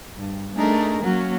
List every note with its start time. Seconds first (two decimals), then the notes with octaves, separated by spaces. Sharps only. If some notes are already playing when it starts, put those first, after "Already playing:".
0.15 G2
0.55 A3 D4 D#4 G#4 A#4
1.02 F#3 A#3 C#4 F#4